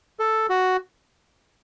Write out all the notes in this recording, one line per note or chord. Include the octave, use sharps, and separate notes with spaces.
A4
F#4